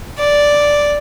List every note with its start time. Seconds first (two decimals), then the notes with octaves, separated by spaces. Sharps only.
0.19 D5